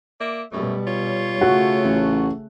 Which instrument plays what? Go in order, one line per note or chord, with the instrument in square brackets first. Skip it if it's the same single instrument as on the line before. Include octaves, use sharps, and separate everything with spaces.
[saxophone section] A#3 D5 E5
[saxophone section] F#2 A3 [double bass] B2 G3
[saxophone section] F4 C#5
[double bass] C#3 A3 [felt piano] F#4
[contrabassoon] A1